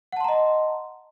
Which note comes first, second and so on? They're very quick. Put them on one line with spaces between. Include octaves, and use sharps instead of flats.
F#5 A5 C6 A#5 D#5